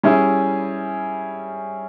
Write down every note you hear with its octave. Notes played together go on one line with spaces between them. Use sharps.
G3 C#4 E4 G#4